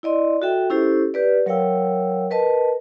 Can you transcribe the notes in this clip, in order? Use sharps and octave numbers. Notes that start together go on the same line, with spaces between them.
E4 D5 D#5 C6
F#4 A4 E5 G5
C#4 E4 G4 A4 C5
G4 B4 D5
F#3 A#4 C#5 F5 G5 E6
A#4 B4 D#5 A5